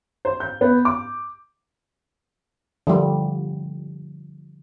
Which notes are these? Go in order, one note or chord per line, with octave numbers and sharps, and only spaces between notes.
C5
G6
B3
D6
D3 F3 G3